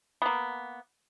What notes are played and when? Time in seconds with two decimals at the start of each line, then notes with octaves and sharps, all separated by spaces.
0.22 A#3 B3